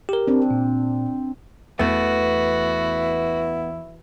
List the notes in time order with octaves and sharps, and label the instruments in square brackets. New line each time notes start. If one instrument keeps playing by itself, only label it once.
[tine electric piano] G4 A#4
[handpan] C4 D4
[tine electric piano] A#2
[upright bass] E2 [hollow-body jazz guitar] A3 B3 [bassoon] E4 [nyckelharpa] F#4 B4